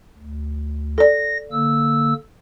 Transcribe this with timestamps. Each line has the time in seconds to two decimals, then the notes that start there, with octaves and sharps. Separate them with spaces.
0.18 D2
0.98 A4 D5 A#6
1.52 D3 A#3 E6